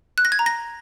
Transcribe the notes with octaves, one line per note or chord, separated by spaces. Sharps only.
F#6
A#6
G#6
A#5
A#6